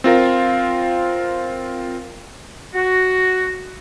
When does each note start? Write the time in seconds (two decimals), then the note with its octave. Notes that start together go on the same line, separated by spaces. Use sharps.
0.04 C4 F4 A#4 F5
2.74 F#4